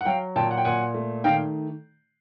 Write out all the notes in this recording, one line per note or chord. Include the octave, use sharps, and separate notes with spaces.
F#5
F#3 F5 G5
A#2 G5 A5
F#5
G5
A#2 F#5 G#5
A3
D#3 F5 G5